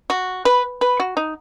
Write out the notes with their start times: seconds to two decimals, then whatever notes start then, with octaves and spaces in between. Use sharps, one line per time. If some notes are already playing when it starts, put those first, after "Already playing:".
0.10 F#4
0.45 B4
0.81 B4
1.00 F#4
1.17 D#4